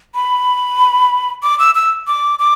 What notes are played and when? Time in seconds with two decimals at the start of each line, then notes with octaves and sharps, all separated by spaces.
0.15 B5
1.43 D6
1.59 E6
1.75 E6
2.07 D6
2.39 D6